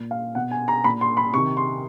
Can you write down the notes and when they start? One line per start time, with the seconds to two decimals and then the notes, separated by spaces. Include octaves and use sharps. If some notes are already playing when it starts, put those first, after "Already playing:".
Already playing: A#2
0.11 F5
0.35 B2 F#5
0.51 G#5
0.68 A#5
0.84 A#2 B5
1.01 C6
1.17 B5
1.33 C3 C#6
1.37 D#3
1.57 C6